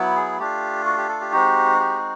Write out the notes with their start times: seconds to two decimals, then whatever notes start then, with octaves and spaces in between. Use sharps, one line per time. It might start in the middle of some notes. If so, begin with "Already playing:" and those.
Already playing: F#3 B3 E4
0.16 G#4
0.39 A3 D4 F4 G4
0.85 F#4
0.97 G4
1.09 A4
1.21 G4
1.32 G#3 C4 D#4 F#4
1.80 G4